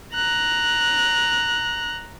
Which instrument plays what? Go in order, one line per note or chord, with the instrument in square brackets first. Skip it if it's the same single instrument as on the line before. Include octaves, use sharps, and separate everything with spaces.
[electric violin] A#5 F#6